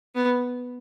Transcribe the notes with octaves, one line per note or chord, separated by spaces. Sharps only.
B3